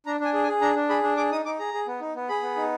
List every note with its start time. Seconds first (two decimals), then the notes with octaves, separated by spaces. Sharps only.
0.06 D4 A#5
0.20 D4 G#5
0.34 G#4
0.43 G#5
0.48 G#4
0.61 D4 A#5
0.76 D4
0.89 G#4 B5
1.03 D4
1.17 G#4 D6
1.32 D#4 D#6
1.45 D#4 D6
1.59 G#4 A#5
1.74 G#4
1.87 B3
2.01 D#4
2.16 B3
2.29 G#4 B5
2.43 B3
2.57 D#4